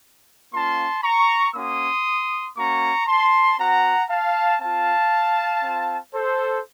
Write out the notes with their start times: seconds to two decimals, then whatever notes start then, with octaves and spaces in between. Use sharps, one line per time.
0.53 A#3 C#4 F4 A5 C6
1.03 A#5 C#6
1.54 A#3 C#4 F#4 C6 D#6
2.57 A#3 C#4 F#4 A#5 C#6
3.07 A5 C6
3.58 C4 F#4 F#5 A#5
4.09 F5 A5
4.60 C4 F4 F5 A5
5.63 C4 F4
6.14 A4 C5